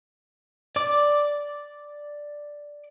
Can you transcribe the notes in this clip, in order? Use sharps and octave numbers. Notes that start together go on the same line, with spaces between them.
D5 D6